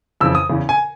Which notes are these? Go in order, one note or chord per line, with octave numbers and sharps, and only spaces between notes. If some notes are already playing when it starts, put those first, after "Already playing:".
F2 C#3 E3 E6
D#6
E2 C#3 E3
G#5